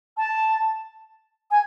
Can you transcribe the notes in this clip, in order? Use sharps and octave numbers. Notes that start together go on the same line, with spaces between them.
A5
G#5